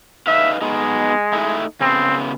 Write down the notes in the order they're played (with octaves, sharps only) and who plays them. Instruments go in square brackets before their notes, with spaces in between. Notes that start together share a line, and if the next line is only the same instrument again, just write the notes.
[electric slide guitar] D#4 B4 F5 [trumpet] E5
[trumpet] G#3 [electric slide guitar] B3 D#4
[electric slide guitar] A3 D#4 E4
[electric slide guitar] C#3 B3 [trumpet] C4